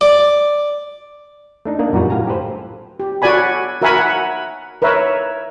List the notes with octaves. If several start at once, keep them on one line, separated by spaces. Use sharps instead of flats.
D5
A3 D4 D#4
A#3 D4 A#4 D#5 F#5
F#2 A#2 G3 F#4 B4 A#5
A2 F5 G#5 A#5
G4 A4 B4 C5
G4
F#4 A4 D5 G#5 B5
F#4 A#4 E5 F#5 G#5 B5
F#5
A#4 B4 C#5 E5